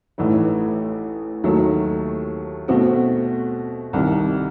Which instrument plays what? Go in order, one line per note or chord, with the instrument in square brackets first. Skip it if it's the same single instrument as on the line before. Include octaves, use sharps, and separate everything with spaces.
[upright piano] A1 A2 E3 A3 D#4
D#2 D#3 F#3 A3
B2 A3 C4 F#4
C2 C3 D#3